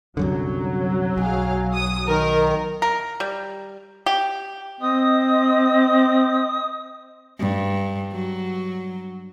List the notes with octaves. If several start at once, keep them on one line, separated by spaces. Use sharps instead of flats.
C2 F#2 D3 F#3
B1 G#4 F5
D#6
D#3 A#4
A#4
G3
G4
C4 D#5 D#6
G2
F#3